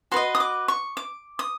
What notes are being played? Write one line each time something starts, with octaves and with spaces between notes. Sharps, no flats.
F#4 B4 D#5 C6
D#6
D6
C#6
D6
D#6